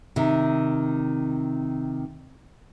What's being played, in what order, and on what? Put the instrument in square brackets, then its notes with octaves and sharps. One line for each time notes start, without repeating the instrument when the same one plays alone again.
[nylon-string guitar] C3 D#3